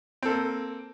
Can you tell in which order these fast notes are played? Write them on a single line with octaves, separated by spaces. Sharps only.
C4 A4 A#3